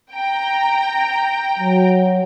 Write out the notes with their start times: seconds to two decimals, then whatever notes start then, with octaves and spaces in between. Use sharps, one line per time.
0.12 G5 A#5
1.59 F#3